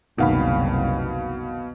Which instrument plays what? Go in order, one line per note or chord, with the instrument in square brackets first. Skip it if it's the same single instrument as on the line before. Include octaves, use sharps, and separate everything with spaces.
[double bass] F#1 C2 [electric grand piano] B2 F5 B5 [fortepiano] D#3 F#4